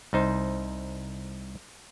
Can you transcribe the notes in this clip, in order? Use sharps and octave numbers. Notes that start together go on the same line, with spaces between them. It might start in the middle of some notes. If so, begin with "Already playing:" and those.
C2 D#4 C5